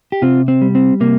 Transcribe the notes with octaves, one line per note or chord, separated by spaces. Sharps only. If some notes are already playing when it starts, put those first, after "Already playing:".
G4
C3 C4 F4
C4
G3
C4
C3 A#3